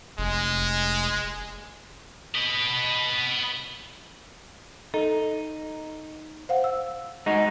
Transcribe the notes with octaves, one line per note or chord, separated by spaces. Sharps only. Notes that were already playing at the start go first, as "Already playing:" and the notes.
F1 G#3
B4 D#5
D#4 A4
C5 F5 F#5
E6
G#3 D#4 F#4